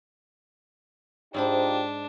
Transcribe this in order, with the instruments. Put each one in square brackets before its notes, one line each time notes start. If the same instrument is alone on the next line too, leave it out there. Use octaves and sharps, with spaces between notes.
[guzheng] G#2 C5 B5 [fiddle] D4 [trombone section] D#4 F4 G4